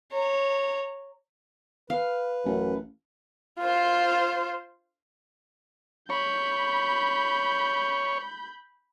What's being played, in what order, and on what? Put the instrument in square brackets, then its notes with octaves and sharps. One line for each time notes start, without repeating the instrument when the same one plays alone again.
[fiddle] C#5 A#5
[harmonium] B4 [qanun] F5
[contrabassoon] A1 [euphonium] F#2
[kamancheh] F4 C5
[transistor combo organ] C#5 [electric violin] B5 G6